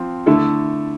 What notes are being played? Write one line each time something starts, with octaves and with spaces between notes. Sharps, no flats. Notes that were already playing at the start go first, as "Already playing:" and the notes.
Already playing: F3 C4
D3 A3 E4 A4